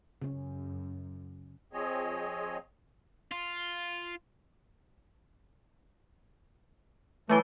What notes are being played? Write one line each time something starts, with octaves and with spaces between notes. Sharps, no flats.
F#2 C#3 C#4
F3 C4 G#4 C#5 D#5
F4
E3 F#3 G#3 A3 B4